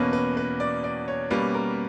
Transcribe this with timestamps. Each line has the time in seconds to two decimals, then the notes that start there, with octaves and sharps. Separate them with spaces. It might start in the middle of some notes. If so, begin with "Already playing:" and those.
Already playing: E2 B2 A#3 C#4 B4
0.13 B4
0.37 B4
0.60 D5
0.84 D5
1.08 C#5
1.30 B2 G3 A#3 C#4 B4
1.55 A#4